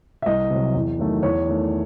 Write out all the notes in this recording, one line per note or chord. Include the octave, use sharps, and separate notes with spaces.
E5
C2 D#5
C3 F#3
E2
D#3 F#3 A3
E2 C#5
D#3 A3